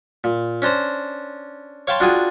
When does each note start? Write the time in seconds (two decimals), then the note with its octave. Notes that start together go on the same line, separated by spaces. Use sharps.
0.24 A#2
0.62 C#4 D4 C5 A#5
1.87 C#5 F5 G5 A5 C6
2.00 D4 F4 F#4 G#4 G5 G#5